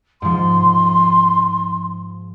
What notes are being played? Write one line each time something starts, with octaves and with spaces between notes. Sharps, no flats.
G#2 F3 C6